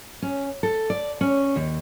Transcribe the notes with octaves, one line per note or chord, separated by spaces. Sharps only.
C#4
A4
D5
C#4
D#2